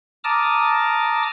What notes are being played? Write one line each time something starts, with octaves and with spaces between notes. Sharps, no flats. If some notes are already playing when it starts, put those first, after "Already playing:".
A5 A#5 D6 D#6 F6